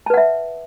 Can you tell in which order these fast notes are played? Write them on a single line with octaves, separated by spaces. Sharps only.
A5 B4 F#5 E5